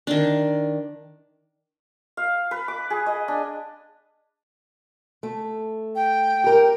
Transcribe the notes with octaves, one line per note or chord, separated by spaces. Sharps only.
D#3 D4
F5
B4
D6
G#4
D#5
D4
A3
G5
G4 A#4